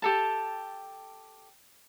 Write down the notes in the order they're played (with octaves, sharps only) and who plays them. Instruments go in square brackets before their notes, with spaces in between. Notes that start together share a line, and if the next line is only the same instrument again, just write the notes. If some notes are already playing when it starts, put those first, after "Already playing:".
[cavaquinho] G4 A4 A5